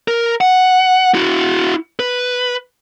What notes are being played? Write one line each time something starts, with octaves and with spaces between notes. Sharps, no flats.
A#4
F#5
E4 F#4
B4